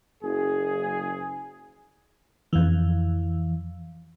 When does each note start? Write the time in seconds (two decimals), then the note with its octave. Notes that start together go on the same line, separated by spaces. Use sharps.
0.23 F#1 G#4
2.53 F2 E3